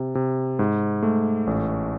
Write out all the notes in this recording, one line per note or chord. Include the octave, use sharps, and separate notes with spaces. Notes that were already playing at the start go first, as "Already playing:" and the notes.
Already playing: C3
C3
G#2
A3
A1